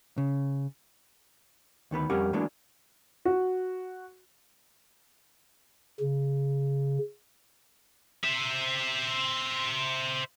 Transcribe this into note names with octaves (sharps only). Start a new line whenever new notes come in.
C#3
D2 D#3 B3 B4
F2 G3 C#4 G4 A#4 F#5
E3 F#3 G#3 A#3 B3 D4
F#4
C#3
C5 E5